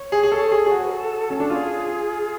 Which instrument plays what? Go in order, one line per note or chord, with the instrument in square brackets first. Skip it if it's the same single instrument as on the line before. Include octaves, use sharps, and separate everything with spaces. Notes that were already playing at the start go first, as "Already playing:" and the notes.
Already playing: [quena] C#5
[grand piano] G#4
G#4
A4
G#4
G#4
F#4
[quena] A4
[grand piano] C#4
D4
[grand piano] F4 [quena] G#4 A4